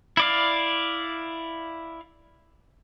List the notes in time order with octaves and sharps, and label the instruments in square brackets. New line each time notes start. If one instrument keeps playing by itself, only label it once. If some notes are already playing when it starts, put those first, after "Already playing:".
[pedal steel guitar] E4 D5 F5